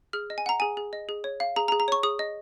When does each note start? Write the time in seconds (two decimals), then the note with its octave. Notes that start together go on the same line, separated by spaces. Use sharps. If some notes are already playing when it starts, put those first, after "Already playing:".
0.13 G#4 F6
0.30 D#5
0.38 G#5
0.46 F#5 A#5
0.60 G#4 G#5
0.77 G#4
0.93 D#5
1.09 G#4
1.24 C#5
1.40 F5
1.56 G#4 A#5
1.68 A#5
1.72 G#4
1.80 A#5
1.88 C#5 C#6
2.03 G#4 D#6
2.19 D#5